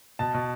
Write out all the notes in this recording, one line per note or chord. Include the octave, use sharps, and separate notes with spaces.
B2 A5
B2